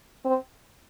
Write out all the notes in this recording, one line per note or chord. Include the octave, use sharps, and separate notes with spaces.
C4